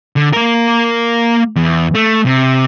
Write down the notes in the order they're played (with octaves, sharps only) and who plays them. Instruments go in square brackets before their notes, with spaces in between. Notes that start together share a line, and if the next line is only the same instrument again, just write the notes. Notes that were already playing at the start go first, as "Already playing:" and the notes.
[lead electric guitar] D3
A#3 A#4
E2
A3
C3